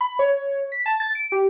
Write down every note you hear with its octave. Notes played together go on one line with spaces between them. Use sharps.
B5
C#5
B6
A5
A6
D7
G4